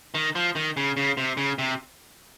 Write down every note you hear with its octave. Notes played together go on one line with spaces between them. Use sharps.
D#3
F3
D#3
C#3
C#3
C3
C#3
C3